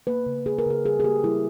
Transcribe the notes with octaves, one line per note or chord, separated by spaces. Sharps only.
A#3 B4
C#3
A#3 G#4
A#4
C#3 G#4
G3 G#4
G#4
A#3 G4
G3 E4